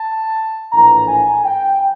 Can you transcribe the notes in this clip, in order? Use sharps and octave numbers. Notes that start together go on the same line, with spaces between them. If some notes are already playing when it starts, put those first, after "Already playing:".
Already playing: A5
A#1 A2 E3 A#5
G#5
G5